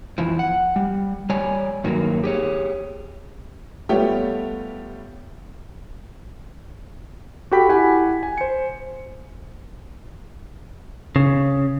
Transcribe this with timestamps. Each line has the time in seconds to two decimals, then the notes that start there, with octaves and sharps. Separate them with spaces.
0.18 F2 E3 F3
0.39 F#5
0.76 G3
1.29 G3 C#5 D5 G#5
1.84 G2 D#3 F#3 A#3
2.24 G4 G#4 C#5
3.89 G3 A3 B3 F4 G4 C#5
7.51 F#4 G4 A4 G5 B5 B6
7.69 E4 G4 F#5 G#5 B5
8.23 G#5
8.38 C5 C#7
11.16 C#3